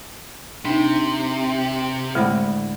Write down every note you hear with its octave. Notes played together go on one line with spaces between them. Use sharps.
C3 D4 D#4
A2 D3 G#3 C5 B5